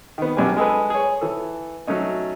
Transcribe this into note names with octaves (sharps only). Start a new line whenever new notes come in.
D#3 B3
A#1 F#2 D4 G4 G#5
G#3 G#4 A4 B4
G#4 C#5
E3 A4
F#3 A3 C#4 D#4